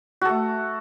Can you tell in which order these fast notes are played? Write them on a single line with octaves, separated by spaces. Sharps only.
F#4 A4 A3